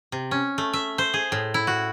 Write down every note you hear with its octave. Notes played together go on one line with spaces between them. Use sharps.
C3
C#4
A3
E5
C5
G#4
A2
E4
F#4